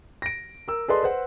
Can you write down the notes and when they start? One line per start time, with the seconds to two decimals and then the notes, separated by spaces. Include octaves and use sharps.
0.22 A#6 D7
0.68 A#4 E6
0.88 G#4 A4 B4 D5 D#5 C6
1.03 B4 C5 F#5